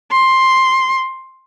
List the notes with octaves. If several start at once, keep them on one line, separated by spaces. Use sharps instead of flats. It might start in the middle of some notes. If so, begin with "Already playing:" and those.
C6